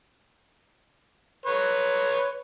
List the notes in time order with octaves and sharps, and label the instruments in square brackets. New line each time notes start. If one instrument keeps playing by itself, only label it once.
[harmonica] B4 C#5